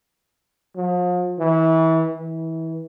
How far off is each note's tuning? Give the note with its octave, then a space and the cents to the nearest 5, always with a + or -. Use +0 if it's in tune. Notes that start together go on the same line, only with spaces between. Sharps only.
F3 +40
E3 -30
E3 -25